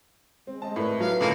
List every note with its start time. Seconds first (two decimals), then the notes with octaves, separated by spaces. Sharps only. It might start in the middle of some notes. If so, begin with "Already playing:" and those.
0.47 G#3 C4
0.62 C4 D#5 A5
0.76 A2 E4 A#4 B4 D5
1.00 F#3 B4 F5
1.21 C#2 A2 D3 A#3 F4 A4 G#5